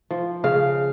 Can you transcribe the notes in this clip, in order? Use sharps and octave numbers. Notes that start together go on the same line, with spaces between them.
F3
C#3 F5